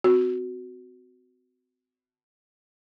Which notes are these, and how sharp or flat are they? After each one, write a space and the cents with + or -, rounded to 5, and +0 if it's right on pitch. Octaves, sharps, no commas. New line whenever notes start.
C4 -40 F#4 +0